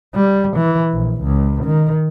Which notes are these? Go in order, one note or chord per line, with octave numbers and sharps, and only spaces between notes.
G3
E3
A#1
C#2
D#3